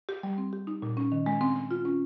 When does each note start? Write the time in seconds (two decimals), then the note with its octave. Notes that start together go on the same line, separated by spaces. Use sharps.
0.09 G4
0.23 G3
0.38 C4
0.53 G4
0.67 D#4
0.82 A#2
0.97 C#4
1.12 D#3
1.26 G#3
1.41 C4
1.56 C4
1.71 F4
1.85 C#4